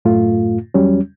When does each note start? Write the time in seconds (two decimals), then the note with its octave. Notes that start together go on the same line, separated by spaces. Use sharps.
0.05 F#2 A2 A3 F4
0.74 E2 F#3 G3 C#4